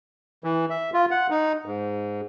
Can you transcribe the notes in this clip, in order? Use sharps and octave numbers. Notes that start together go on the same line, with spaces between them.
E3
E5
F4
F#5
D#4
G#2